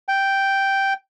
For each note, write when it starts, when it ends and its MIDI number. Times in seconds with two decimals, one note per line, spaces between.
0.08 0.93 79